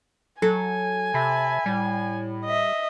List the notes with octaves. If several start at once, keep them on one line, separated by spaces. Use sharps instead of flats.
F#3 A4 G#5
C3 E5 A5 B5
A2 G3
D#5 E5